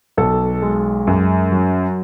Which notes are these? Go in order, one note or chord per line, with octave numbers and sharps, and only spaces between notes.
B1 A4
G#3
F#2
F#3